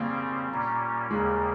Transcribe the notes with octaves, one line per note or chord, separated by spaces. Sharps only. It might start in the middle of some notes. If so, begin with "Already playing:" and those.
Already playing: C#3 G3 A#3 C4
A#2 G3 A#3 C#4
D#2 C#3 G3 G#3 A#3